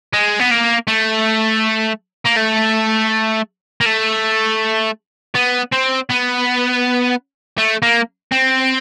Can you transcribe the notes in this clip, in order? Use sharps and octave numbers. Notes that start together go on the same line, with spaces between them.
G#3
B3
A#3
A3
A#3
A3
A#3
A3
B3
C4
B3
A3
A#3
C4